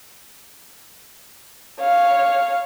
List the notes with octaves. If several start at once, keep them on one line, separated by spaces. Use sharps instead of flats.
C#5 F5